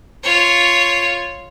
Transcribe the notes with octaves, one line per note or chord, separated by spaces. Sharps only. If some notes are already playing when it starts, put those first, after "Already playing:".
F4 C#5